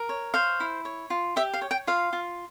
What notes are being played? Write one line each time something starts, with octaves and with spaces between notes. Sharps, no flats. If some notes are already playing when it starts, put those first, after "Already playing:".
Already playing: A#4
C#5
C5 F5
E4
C#5
F4
G4 E5
F5
C#5
G5
F4 F5
F4